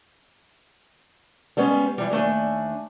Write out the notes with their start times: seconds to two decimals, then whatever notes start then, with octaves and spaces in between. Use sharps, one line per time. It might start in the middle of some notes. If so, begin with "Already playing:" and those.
1.57 G3 G#3 B3 C#4
1.98 E3 G3
2.11 D#2 A3 D4 G#5